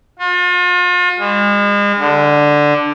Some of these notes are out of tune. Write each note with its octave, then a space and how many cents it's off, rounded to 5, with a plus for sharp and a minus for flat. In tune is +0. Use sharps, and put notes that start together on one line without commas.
F4 +40
G#3 -35
D3 +5